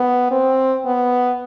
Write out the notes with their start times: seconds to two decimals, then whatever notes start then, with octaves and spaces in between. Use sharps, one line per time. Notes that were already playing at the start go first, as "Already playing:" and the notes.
Already playing: B3
0.31 C4
0.85 B3